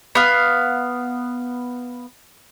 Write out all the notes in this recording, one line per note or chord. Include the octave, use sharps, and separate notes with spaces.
B3 F5